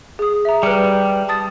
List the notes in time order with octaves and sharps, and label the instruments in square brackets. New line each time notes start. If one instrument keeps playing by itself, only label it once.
[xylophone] G#4 D#6
E5 A#5
[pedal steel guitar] G3 [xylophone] B4 F6 C#7
[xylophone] A5 D#6 A6